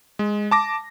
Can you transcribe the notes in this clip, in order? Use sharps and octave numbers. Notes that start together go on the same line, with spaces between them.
G#3
A5 D6 A#6